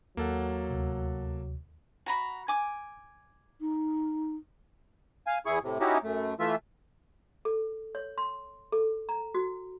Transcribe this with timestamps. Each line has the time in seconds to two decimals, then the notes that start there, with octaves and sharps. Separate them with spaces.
0.17 D#2 F#3 A#3 A4 F#5
0.70 D2 C3
2.06 F#4 A#5 B5
2.48 G#5 D6
3.61 D#4
5.27 F5 G#5
5.46 E2 E4 G#4 C#6
5.63 A2 C3
5.80 C#4 D#4 E4 F#4 G4
6.03 F#2 A3
6.39 E3 A3 F4 E5
7.45 A4
7.95 C#5
8.18 C6
8.72 A4
9.09 A#5
9.35 F#4